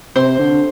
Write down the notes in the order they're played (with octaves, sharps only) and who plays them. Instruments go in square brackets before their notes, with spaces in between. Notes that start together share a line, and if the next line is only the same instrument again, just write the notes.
[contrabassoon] C3 [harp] C5 C6
[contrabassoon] D3